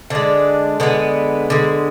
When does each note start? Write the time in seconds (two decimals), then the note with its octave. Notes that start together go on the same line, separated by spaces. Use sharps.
0.10 D3 G#3 D4
0.80 D3 G#3 B3
1.50 D3 G#3